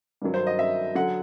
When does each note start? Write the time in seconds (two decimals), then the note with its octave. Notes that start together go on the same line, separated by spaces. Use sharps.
0.22 G2 D#3 F#3
0.34 C5
0.47 D#5
0.59 E5
0.95 D3 F#3 F#5